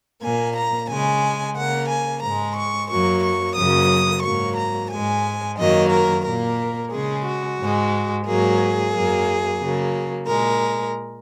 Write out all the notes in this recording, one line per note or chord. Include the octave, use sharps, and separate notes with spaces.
A#2 A#3 G#5
A#5
C#3 G#3 G#5
C#3 A#3 F#5
G#5
G#2 G#3 A#5
C#6
F#2 F#3 A#3 C#6
C#6
F#2 C#3 F#3 A#3 D#6
G#2 F#3 A#3 C#6
A#5
G#2 G#3 G#5
F#2 D#3 F#3 A#3 D#5
A#4
A#2 A#3 A#4
C#3 G#3 G#4
F#4
G#2 G#3
G#2 F#3 A#3 G#4
F#2 F#3 A#3
C#3 F#3 A#3
A#2 G#3 A#4